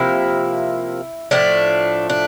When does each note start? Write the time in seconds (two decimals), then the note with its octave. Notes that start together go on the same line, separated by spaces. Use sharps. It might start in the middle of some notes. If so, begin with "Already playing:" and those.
Already playing: C3 F3 A#3 E4
1.31 A2 F3 A3 D4
2.10 D4